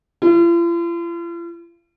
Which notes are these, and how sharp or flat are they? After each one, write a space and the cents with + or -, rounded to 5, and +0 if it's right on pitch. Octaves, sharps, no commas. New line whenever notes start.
F4 -45